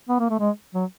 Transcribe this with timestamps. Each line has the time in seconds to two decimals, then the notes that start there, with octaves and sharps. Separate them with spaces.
0.09 B3
0.20 A#3
0.30 A3
0.40 G#3
0.74 F#3